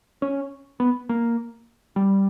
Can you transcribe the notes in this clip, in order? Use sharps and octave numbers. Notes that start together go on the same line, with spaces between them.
C#4
B3
A#3
G3